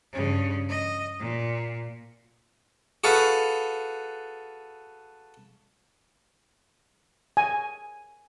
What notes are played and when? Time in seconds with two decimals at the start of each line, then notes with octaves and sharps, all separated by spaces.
0.13 G2 C#3
0.69 D#5
1.19 A#2
3.04 F#4 G#4 A4 B4 F5
7.37 G#5